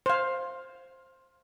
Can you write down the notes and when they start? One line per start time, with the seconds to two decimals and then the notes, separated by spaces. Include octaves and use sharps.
0.06 C5 F5